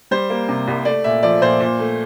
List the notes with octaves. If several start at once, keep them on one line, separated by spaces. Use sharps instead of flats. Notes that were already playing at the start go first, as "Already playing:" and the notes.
G3 C5
A#3
C3
C2
A3 D5
A#2 E5
F3 D5
A#2 C5
A#2
A3